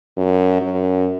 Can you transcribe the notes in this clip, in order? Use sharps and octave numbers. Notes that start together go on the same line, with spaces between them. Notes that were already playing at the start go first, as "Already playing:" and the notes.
F#2
F#2